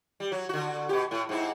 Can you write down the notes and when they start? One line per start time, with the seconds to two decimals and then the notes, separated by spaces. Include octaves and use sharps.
0.20 G3
0.32 F#3
0.49 D3 F#4
0.89 B2 G4
1.11 A2
1.29 G#2 C4 E4